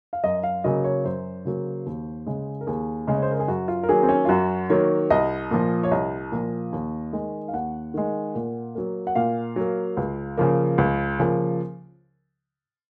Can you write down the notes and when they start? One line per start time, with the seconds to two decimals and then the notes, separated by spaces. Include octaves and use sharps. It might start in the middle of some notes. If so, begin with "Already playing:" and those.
0.13 F5
0.24 F#2 D#5
0.43 F5
0.64 C#3 F#3 A#3 D#5
0.84 C#5
1.05 F#2 C5
1.45 C#3 F#3 A#3
1.86 D#2
2.26 C#3 G#3
2.61 A#4
2.67 D#2 G#4
3.07 C#3 G#3
3.14 C#5
3.22 C5
3.31 A#4
3.40 G#4
3.48 F#2 F#4
3.68 F4
3.83 A#4
3.88 D#3 F#3 A#3 G#4
4.03 C4
4.09 C#4
4.25 F4
4.29 F#2 F#4
4.69 D#3 F#3 A#3 C#5
5.10 C2 D#5
5.51 A#2 F3
5.83 C#5
5.91 C2 D#5
6.32 A#2 F3
6.72 D#2
7.13 D#3 G#3
7.48 F5
7.53 D#2 F#5
7.94 D#3 G#3
8.35 A#2
8.75 F#3 A#3
9.07 F#5
9.15 A#2 F5
9.56 F#3 A#3
9.97 C#2
10.37 C#3 F3 A#3
10.78 C#2
11.19 C#3 F3 A#3